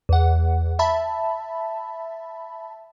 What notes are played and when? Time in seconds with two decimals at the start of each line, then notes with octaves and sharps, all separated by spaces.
0.09 E2 F#5
0.79 E5 A5 B5